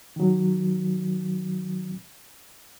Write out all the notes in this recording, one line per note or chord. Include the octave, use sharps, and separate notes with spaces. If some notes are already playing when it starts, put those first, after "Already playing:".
D#3 F#3